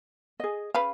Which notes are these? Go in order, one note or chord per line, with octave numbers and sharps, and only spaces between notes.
G#4 D#5
C#3 B4 F5 B5